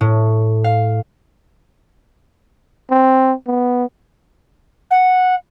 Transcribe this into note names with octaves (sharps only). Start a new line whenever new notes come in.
A2
F5
C4
B3
F#5